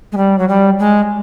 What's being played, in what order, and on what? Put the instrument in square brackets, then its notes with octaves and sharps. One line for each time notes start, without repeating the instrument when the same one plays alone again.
[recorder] G#3
G3
F#3
G3
G#3